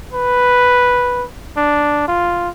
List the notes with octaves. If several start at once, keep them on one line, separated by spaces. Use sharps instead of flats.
B4
D4
F4